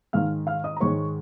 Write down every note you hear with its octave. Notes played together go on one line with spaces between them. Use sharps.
G#2 D#3 G#3 F5 F6
F5 F6
D#5 D#6
A#5
G#2 D#3 G#3 C#5 C#6